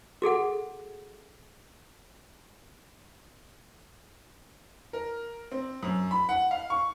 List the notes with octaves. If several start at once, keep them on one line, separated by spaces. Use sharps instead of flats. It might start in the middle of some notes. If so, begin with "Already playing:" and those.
F#4 G#4 A4 F#5
A#4
C4
F#2
B5
F#5
F5
C#6